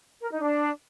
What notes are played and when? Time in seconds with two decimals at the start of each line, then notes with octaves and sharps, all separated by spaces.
0.22 A#4
0.31 D#4
0.40 D4